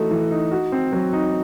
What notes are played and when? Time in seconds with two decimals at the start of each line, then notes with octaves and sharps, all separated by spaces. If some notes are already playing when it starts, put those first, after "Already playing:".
Already playing: E3 A3 D#4 F#4
0.11 E3
0.31 D#4
0.51 F#4
0.72 C4
0.92 F#3
1.13 D#4